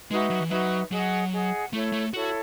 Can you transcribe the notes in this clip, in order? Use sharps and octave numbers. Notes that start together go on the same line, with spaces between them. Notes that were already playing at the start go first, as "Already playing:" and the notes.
G#3 D#4 F#4 B4 E5
F#3
E3
F#3 D#4 F#4 B4 E5
F#3 G#4 D#5 F#5
G#4 D#5 F#5
A3 E4 A4 C#5
A3
E4 F#4 A4 C#5